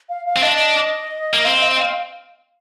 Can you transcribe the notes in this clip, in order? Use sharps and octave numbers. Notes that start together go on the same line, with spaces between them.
F5
F5
C4
D4 D#5
A#3
C4 F5
D#5
F5